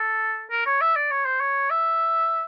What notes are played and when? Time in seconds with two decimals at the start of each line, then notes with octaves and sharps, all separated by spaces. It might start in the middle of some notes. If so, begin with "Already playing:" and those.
Already playing: A4
0.51 A#4
0.66 C#5
0.81 E5
0.96 D5
1.11 C#5
1.26 C5
1.40 C#5
1.70 E5